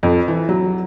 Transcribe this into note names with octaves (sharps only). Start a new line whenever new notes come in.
F2
E3
F#3